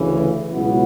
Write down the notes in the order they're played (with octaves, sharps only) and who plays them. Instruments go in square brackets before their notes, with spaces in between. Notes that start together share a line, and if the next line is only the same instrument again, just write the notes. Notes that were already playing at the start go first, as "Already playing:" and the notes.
Already playing: [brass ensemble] D2 C#3 E3
C#2 B2 F#3 B3 E4